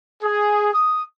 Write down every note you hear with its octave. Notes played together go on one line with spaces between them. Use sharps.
G#4
D#6